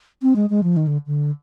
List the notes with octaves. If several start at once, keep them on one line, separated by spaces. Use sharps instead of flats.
C4
G#3
G#3
F3
D#3
D3
D3